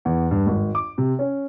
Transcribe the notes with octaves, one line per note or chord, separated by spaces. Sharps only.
E2
G2
G#1
D6
C3
C#4